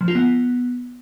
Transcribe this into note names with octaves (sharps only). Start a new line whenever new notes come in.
F3
F4
B3